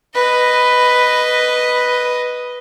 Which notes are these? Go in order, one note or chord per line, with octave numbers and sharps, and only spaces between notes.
B4 D#5